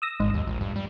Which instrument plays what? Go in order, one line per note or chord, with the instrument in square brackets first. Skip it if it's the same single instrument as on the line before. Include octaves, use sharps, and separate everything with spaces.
[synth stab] D#6 E6 A#6
[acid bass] G#1 [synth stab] G#2
[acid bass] D#2
A#1
G2
G3